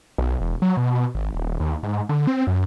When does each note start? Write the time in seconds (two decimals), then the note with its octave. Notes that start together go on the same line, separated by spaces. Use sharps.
0.18 B1
0.41 E1
0.62 F#3
0.77 B2
1.15 G#1
1.35 D#1
1.60 D#2
1.83 G#2
2.09 D3
2.27 C4
2.47 F#2